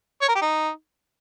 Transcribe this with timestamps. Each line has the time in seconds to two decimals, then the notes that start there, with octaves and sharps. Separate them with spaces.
0.22 C#5
0.29 A#4
0.35 G4
0.42 D#4